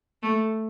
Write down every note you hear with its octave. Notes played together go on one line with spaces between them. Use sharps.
A3